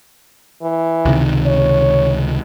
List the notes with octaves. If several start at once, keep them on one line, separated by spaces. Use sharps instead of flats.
E3
C#2 C3 D#3
C#5